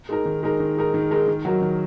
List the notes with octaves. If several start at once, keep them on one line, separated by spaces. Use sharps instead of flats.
G#3 D#4 A#4
D#3
G#3 D#4 A#4
D#3
G#3 D#4 A#4
D#3
G#3 D#4 A#4
D#3
F#3 D#4 F#4 A#4
D#3